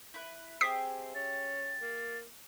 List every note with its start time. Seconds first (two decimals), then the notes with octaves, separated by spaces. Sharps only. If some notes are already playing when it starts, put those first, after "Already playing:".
0.14 E4 B4
0.61 C4 G4 G#4 E5 D#6 B6 C7
1.15 C#4 A6
1.81 A#3